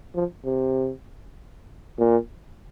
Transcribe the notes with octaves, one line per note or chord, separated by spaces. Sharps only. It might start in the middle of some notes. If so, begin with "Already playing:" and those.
F3
C3
A#2